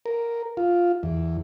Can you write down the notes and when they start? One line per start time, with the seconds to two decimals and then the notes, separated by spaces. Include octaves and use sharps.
0.06 A#4
0.57 F4
1.03 E2